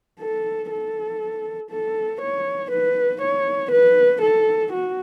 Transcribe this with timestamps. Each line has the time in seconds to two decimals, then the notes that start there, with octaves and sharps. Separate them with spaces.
0.20 A4
0.70 A4
1.71 A4
2.22 C#5
2.71 B4
3.22 C#5
3.72 B4
4.22 A4
4.73 F#4